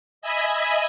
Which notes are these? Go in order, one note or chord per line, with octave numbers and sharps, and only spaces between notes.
D#5 E5 G#5 B5